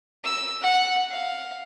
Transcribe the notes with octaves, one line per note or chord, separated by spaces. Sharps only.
E6
F#5
F5